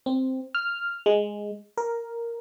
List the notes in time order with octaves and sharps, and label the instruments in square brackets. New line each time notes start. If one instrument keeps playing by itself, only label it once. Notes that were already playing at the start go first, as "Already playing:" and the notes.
[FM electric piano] C4
F6
G#3
A#4